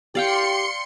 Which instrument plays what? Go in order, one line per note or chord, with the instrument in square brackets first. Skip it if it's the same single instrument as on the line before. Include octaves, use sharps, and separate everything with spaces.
[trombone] G4 [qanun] D5 F5 G5 [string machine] C6 C#7